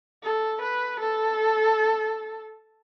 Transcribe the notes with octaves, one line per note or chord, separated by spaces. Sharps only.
A4
B4
A4